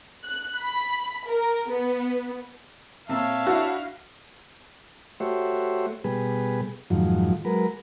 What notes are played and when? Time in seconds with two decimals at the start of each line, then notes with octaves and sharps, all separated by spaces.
0.24 F#6
0.59 B5
1.27 A#4
1.70 B3
3.09 A#2 C4 C#5 E5 F5 A5 A#5
3.47 D4 E4 F#4
5.20 A3 F#4 G4 C5 C#5 E5
6.04 B2 G3 G#4 B4
6.90 F2 G#2 D#3 F3 F#3
7.45 F#3 G#3 A#4 B4